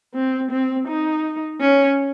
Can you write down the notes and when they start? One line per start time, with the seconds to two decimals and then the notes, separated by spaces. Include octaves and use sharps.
0.14 C4
0.51 C4
0.88 D#4
1.61 C#4